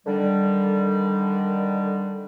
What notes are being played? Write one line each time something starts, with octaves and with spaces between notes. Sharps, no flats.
D3 D#3 G3